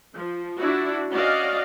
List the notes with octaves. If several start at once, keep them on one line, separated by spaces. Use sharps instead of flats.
F3
D4 E4 F#4
C#4 F#4 D5 D#5 F5